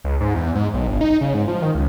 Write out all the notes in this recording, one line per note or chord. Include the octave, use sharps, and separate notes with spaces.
C#2
G#2
E2
G#2
B1
G1
D#4
C#3
G#2
F3
D#3
C#2